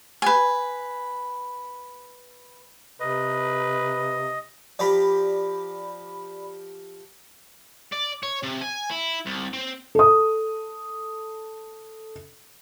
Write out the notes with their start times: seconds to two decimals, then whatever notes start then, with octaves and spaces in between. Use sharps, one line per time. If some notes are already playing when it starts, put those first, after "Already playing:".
0.22 B4 G#5
3.00 C3 B4 D#5
4.79 F3 G4 D5 A#5 B5
7.92 D5
8.23 C#5
8.43 C3
8.62 G#5
8.91 E4
9.26 C2
9.53 C4
9.95 A4 D#6